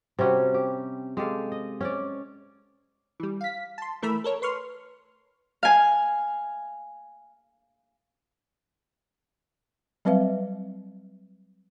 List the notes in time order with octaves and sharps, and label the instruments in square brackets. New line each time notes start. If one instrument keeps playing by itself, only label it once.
[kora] C3 G3 C#4 F#4
G4
G#3 G4 A4 F5
D#5
C#4 C#5 D5
[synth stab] E3 G3
F5 B6
A5 C6
E3 A3 A#4 B5 E6
A4 A#4 C#5
B4 C6 C#6 F6
[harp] F5 G#5
[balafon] F#3 G3 C4 B4 E5 F5